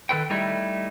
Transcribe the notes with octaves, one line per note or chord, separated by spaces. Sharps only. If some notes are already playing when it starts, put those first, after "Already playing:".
D#3 A4 B4 G5
G3 A3 D#4 E4